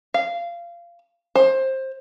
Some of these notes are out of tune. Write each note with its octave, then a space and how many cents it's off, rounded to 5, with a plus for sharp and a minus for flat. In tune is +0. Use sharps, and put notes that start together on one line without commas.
F5 -20
C5 +20